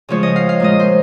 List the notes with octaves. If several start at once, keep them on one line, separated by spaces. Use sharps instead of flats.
C#3 F3 G#3 C#5
D#5
F5
F5
A#2 G#3 D#5
C5